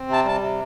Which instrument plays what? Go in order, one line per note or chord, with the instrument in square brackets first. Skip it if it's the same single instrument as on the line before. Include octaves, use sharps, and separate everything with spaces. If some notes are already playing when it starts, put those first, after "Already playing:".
Already playing: [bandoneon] C4
C3 A5
G3 A5
C3